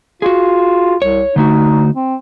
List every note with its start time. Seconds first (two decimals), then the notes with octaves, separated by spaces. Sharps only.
0.22 F4 F#4 G#4
1.02 C2 C#5
1.36 D3 A3 D#4 F#4
1.96 C4